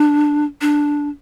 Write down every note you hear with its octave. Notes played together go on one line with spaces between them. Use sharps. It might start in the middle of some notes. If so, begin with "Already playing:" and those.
Already playing: D4
D4